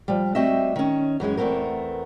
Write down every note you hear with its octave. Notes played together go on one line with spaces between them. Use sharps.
F3 G3
G3 A3 C4 F#4 D#5 E5
D#3 C#4
F#2 E3 G#3 C#4
E2 A3 B3 C4 A#4